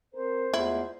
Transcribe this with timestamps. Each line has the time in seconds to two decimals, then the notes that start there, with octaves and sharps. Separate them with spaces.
0.14 C4 A#4 C5
0.54 E2 G#3 A3 E4 F4